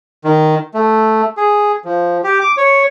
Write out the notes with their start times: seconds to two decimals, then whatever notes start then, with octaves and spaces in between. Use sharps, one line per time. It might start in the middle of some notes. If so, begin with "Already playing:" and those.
0.24 D#3
0.74 A3
1.37 G#4
1.85 F3
2.24 G4
2.41 D6
2.57 C#5